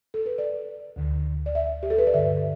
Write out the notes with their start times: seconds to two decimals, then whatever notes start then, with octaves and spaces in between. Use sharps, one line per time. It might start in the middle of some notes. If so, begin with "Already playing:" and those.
0.14 A4
0.26 B4
0.38 D5
0.96 D2 D3
1.46 D5
1.55 E5
1.83 G4
1.90 A4
1.98 B4
2.07 D5
2.14 G2 D3 E5